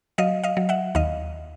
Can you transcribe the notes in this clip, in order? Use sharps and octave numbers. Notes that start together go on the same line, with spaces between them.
F#3 D#5 F5
D#5 F5
F#3
E5 F#5
D#2 D#5 F5